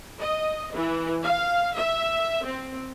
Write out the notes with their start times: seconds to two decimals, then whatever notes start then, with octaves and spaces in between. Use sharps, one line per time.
0.20 D#5
0.73 E3
1.23 F5
1.77 E5
2.44 C4